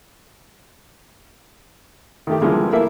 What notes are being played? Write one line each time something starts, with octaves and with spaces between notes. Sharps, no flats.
D#3 A3 G4
D3 E3 F3 G3 G#3 A#3
A3 A#3 E4 A#4 E5